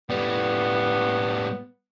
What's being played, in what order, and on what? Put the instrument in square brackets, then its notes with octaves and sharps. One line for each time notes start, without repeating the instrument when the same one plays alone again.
[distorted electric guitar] A2 G3 [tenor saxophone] B3